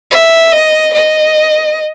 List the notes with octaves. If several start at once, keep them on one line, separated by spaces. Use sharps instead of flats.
E5
D#5
D#5